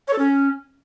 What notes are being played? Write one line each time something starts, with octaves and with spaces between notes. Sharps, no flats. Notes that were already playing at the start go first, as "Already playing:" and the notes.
C#5
A4
C#4